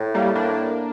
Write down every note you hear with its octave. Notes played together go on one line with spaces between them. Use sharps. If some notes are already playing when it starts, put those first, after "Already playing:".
Already playing: A2
G3 A#3
A#3 D4